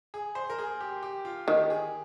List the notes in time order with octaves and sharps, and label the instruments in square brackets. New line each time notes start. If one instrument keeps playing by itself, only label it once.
[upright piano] G#4
C5
A#4
G#4
G4
G4
F4
[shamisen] D#3 [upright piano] G4
[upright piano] G#4